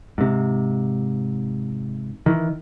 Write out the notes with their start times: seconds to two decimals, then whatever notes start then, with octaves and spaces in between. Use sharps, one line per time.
0.18 G#2 C3
2.26 D#3 E3